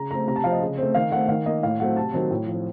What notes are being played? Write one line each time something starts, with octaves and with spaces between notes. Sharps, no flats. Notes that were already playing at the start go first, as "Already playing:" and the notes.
Already playing: C#3 A#5
A3 C4 A#5
C3 A#5
A5
F3 C4 F5
D#5
C#3
A3 C4
D#3 F5
A3 C4 F#5
D#3 F5
A#3 D#5
A2 F5
F#3 A3 C4 F#5
C3 A5
D#3 F#3 C4
A2
F3 C4